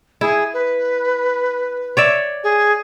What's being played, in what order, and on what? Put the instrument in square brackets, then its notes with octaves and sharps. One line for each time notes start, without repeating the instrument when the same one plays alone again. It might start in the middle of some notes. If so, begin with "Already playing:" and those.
[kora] E4 [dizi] G#4
[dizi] B4
[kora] C#5 D5 E5
[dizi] G#4